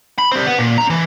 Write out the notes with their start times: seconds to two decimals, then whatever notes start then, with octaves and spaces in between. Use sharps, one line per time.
0.19 B5
0.32 G3 C4
0.46 B3
0.59 A#2
0.78 C#4 A#5
0.90 E3